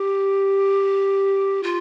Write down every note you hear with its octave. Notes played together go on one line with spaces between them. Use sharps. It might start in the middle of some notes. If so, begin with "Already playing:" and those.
Already playing: G4
F4